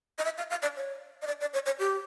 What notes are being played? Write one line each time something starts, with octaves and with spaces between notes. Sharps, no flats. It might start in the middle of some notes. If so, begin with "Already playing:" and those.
D#5
E5
F5
F5
D5
C#5
D#5
D5
D5
C#5
C#5
G4